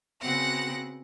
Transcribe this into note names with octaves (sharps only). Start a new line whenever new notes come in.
C#3 B3 C4 F#4 F#5 A#6